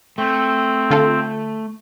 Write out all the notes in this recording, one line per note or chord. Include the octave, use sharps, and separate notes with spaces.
A3 C4
D3 F4 A4